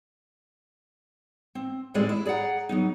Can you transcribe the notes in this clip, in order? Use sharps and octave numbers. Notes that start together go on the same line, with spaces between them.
C4
D#2 A2 G3 G#3 C4 D5
E4
G#4 D5 F5 F#5 A#5
F#3 B3 D#4